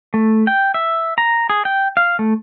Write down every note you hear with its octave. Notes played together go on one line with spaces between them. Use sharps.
A3
G5
E5
A#5
G#4
G5
F5
A3